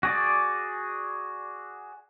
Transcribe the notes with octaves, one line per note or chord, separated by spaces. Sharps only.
F#4 G#4 D5